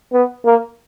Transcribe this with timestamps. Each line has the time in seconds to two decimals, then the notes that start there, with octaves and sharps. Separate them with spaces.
0.13 B3
0.45 A#3